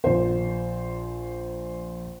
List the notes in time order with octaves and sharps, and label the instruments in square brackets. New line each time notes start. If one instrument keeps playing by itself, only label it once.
[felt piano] A#1 C5